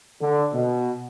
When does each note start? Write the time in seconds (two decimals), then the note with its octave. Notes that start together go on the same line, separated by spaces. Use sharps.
0.21 D3
0.53 B2